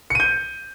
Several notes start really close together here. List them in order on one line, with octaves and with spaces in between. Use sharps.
C#7 D#7 G6